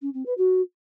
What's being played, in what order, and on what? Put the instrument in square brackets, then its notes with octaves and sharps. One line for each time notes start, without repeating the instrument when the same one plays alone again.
[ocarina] C#4
C4
B4
F#4